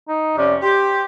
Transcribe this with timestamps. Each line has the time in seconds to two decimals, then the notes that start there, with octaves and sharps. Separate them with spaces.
0.08 D#4
0.37 F2 C3 C#4 D5
0.63 G4 C5